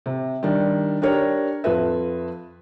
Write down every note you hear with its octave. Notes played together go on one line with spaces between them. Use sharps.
C3
D#3 G3 D4
D4 G4 A#4 C#5
F2 F4 B4 E5